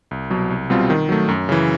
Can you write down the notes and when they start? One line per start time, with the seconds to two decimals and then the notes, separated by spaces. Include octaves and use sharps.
0.11 C2
0.30 B2 F#3
0.50 C2
0.70 B2 G3 C4 F4
0.90 D#3
1.09 F#3 A3
1.28 F#2
1.49 C#3 E3